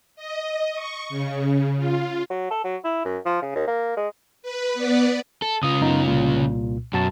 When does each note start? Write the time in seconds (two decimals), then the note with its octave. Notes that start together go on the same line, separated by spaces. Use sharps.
0.16 D#5
0.74 C#6
1.09 C#3
1.77 F4
2.30 F#3
2.51 A4
2.64 F#3
2.84 E4
3.05 F#2
3.26 F3
3.42 C#3
3.55 D#2
3.67 A#3
3.97 G#3
4.42 B4
4.74 B3 B4 D5
5.42 A4
5.63 C#3 F4 D#6
5.81 F#2 B3 D#4
6.07 C2 A#2
6.93 F#2 B2 F#4 A5